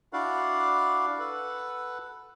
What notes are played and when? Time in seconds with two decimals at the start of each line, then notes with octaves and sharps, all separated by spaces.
0.13 D4 E4 F#4 D5 F5 F#5
1.19 A4 B4 F#5